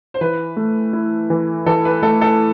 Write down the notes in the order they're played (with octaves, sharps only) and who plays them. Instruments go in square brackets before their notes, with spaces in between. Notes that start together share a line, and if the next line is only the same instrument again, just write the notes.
[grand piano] C5
[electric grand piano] E3 [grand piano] B4
[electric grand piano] A3
E4
E3
[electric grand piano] E3 [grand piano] A4
[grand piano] B4
[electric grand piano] A3 [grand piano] A4
[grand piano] A4